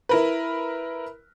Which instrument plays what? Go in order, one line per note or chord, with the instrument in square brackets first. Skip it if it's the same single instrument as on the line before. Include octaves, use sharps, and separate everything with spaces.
[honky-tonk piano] E4 A#4 B4